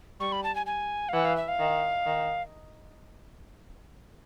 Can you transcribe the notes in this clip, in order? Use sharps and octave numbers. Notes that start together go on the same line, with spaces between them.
G3 C#6
B5
A5
G#5
G#5
F5
E3 F#5
F5
E5
F5
D#3
D#3